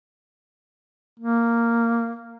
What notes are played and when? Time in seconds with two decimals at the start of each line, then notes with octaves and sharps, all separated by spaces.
1.20 A#3